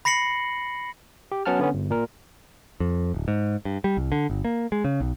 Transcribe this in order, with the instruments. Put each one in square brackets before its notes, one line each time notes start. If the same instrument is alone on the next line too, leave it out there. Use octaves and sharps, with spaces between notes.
[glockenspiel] B5 A#6 C7 C#7 F#7
[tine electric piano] G4
F#3 B3 C#4 F#5 A5 F6
D3 B3 C#4
G1
A#2 A#4
[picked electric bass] F2
D1
G#2
G2
G3
C2
D3
G1
A#3
G#3
C#3
B1